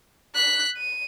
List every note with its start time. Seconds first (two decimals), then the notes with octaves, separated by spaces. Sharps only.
0.35 F#6 B6
0.77 D#7